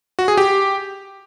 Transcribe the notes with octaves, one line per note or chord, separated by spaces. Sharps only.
F#4
G#4
G4